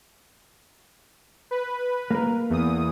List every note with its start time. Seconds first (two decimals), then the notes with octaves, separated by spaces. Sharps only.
1.51 B4
2.11 A#3 A#4
2.50 E2 D#6